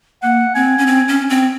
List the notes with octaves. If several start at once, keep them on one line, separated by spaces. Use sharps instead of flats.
A#3 F#5
C4 G#5
C#4
C4
C#4
C4